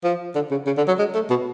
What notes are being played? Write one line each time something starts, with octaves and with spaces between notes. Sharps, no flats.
F3
D3
C#3
C#3
D3
F#3
G#3
A3
B2